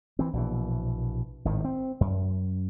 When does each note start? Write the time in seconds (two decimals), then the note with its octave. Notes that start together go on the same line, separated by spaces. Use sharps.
0.19 E3 C4
0.33 A#1 B2 E3
1.45 G#1 A2 D#3
1.65 C4
2.01 F#2